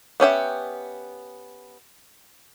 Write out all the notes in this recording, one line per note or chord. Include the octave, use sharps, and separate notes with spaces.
B3 C#4 G4 E5